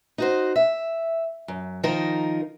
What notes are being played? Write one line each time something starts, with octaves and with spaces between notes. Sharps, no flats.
D#4 F#4 C5
E5
F#2
D#3 F3 D#4 A#4